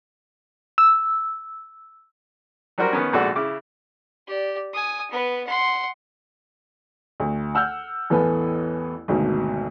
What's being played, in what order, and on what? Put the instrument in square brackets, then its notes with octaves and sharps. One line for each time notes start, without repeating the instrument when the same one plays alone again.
[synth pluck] E6
[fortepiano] F#3 G3 D4 F#4 A#4 C5
D#3 B3 C#4
A#1 G#2 F#4 A4 D5 F#5
C#3 E4 D6
[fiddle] G4 D5
G#5 D#6
B3 B4
F#5 C6
[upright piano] D2
F#5 E6 F6 G6
A1 E2 B3 A4 B4 G#5
G#1 D2 B2